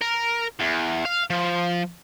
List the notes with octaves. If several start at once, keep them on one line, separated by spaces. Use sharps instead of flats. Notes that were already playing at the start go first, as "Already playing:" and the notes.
A#4
E2
F5
F3